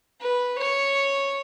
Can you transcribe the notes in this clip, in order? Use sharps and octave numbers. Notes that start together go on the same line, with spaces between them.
B4
C#5